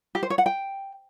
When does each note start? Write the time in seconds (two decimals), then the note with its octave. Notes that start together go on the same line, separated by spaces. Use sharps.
0.15 G4
0.23 C5
0.30 C#5
0.38 F#5
0.46 G5